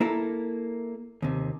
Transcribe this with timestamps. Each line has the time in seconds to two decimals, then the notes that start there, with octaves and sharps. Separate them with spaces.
0.01 A#3 E4 A4 A#4
1.22 D#2 C3